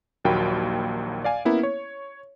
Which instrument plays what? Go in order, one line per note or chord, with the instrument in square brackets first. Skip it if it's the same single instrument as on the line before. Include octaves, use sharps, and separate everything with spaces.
[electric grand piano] A#1 D#2 F#3 A#3 G5 B5
D5 F5 G#5
A#3 B3 C#4 E4 A#4
C#5